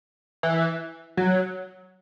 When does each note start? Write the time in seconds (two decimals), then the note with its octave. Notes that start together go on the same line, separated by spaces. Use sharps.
0.43 E3
1.17 F#3